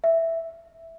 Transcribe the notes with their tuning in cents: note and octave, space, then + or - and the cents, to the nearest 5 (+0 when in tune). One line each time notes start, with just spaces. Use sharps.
E5 +0